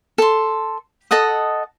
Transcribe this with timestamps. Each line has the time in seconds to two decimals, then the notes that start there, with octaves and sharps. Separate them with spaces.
0.18 A4 C6
1.11 A4 D#5 F#5 D#6